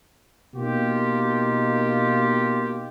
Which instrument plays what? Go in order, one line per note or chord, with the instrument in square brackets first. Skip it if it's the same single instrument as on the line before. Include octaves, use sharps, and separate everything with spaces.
[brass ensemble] B2 A#3 D#4 F4 G4